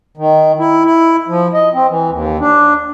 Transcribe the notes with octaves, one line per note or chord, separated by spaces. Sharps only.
D#3
E4
E4
F3
D#5
C4
E3
D#2
D4